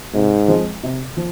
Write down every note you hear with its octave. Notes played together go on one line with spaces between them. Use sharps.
G#2 C3
F3 G#3 C4
C3
F3